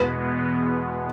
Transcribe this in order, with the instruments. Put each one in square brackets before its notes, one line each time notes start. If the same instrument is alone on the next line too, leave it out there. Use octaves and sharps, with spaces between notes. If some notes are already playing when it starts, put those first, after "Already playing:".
Already playing: [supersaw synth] E2 B2 G#3 B3 [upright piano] B4